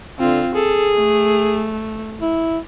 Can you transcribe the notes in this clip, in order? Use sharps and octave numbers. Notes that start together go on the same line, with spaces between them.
D3 C4 F4
G#4 A4
A3
E4